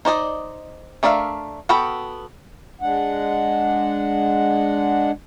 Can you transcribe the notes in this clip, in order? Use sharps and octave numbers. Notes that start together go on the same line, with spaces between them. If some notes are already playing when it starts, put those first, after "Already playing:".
D#4 C5 D5 D#5
A3 D4 A#4 E5 F5
B3 F#4 A4 G5 B5
G#3 D4 F#5